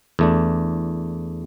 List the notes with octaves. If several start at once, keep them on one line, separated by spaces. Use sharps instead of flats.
E2 A3 D4